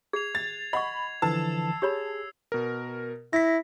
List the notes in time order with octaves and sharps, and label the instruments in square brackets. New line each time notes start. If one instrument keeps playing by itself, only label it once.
[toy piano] G#4 [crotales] G#6 C7 F7
[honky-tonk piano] A6
[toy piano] D#5 F#5 C#6 [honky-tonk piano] B5
[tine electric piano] D3 E3 F3 [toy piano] B4 [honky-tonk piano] A5 [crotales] E6 C7
[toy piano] G4 C#5 B5 [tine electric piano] G#4
[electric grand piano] B2 A#4
[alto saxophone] E4 [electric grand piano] A#6 B6